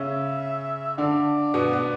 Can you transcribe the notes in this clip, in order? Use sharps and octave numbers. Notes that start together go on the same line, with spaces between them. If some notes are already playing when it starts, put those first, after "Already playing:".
Already playing: C#3 C#4 E5
D3 D4 D5
B2 B3
B3